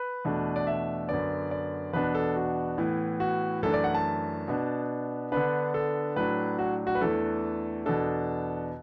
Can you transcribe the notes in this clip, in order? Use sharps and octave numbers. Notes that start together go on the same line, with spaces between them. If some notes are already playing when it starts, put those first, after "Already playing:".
Already playing: B4
E2 B2 A3 D4
D5
E5
F#2 D3 B3 D5
D5
E2 B2 B3 D4 B4
A4
F#4
A2 E3 B3
F#4
F#2 E3 A3 D4 A4
D5
F#5
A5
B2 B3 D4
D3 B3 D4 B4
A4
A2 F#3 D4 B4
F#4
F#4
B4
E2 E3 A3 D4 A4
E2 B2 B3 D4 A4